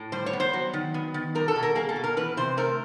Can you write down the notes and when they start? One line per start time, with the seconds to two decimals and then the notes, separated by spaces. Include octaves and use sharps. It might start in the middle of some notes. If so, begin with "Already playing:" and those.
Already playing: A2
0.12 G3 C5
0.26 C#5
0.33 B3
0.40 C5
0.53 F#3
0.73 D#3
0.94 B3
1.14 D#3
1.35 G3 A#4
1.48 A4
1.56 B2
1.63 A#4
1.75 A#3 G#4
1.89 A4
1.96 B2
2.04 A#4
2.17 E3 B4
2.37 C3 C5
2.57 A3 A#4